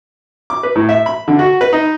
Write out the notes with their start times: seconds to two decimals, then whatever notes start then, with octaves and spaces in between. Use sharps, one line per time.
0.50 D6
0.63 B4
0.75 A2
0.89 E5
1.06 B5
1.28 D3
1.39 F#4
1.61 B4
1.73 D#4